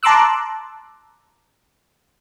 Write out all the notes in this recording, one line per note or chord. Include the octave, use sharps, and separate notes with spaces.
A5 A#5 C6 D6 E6 F#6